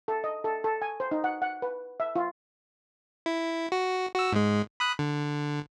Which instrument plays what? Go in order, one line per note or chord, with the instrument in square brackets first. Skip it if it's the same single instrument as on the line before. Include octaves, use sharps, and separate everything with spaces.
[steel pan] A4
D#5
A4
A4
G#5
C5
D#4
F#5
F#5
B4
E5
F4
[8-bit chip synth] E4
F#4
F#4 E6
G#2 G#3
B5 D#6 F#6
D3